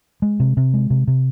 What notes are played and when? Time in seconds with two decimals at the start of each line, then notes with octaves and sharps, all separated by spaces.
0.22 G#3
0.40 C3
0.57 C3
0.74 G#3
0.90 C3
1.07 C3